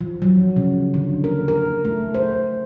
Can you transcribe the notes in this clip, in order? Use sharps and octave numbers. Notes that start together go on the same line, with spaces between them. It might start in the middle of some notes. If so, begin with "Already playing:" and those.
F3
F#3
C#3
D3
A#4
A#4
A3
C5